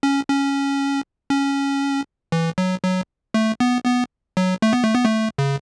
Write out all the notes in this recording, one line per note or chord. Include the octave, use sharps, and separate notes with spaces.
C#4
C#4
C#4
E3
F#3
F#3
A3
B3
B3
F#3
A3
B3
A3
B3
A3
C#3